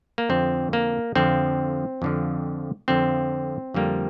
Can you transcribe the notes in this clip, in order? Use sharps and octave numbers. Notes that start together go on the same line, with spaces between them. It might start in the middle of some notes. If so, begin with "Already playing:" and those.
A#3
F2 D3 F3 C4
A#3
F2 D3 F3 C4
F2 D3 F3
F2 D3 F3 C4
F2 D3 G3 A#3